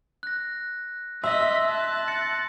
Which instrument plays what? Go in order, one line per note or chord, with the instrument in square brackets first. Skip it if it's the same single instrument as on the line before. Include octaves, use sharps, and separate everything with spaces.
[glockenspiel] F#6 A#6
[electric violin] D#5 B6 [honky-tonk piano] E5 [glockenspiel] C6 E6 A#6
[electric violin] A5 F#6
[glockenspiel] A6 A#6 C#7